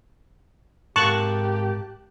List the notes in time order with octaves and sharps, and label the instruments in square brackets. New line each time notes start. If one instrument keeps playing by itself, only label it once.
[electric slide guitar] G#2 A#4 F5 [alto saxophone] G4 [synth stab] A5 F#6 [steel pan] C#6